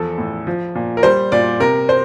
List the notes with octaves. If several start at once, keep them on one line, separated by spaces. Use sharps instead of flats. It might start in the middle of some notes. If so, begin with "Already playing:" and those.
Already playing: E2 F3 A4
A2
F3
A#2
A#4
G3 C5
A#2 D5
C3 A#4
C5